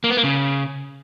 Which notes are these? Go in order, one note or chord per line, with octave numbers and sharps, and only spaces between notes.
A#3
B3
A#3
C#3